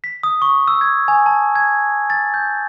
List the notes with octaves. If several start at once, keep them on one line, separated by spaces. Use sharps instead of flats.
B6
D#6
C#6
E6
G#6
G#5
A5
G#6
A6
G6